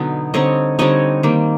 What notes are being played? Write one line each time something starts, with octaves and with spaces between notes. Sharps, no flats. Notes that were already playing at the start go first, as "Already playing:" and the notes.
Already playing: B2 D3 F#3 B3 D#4
D3 G3 C4 D#4 C#5 D#5
D3 G3 C4 D#4 C#5 D#5
D#3 G3 A#3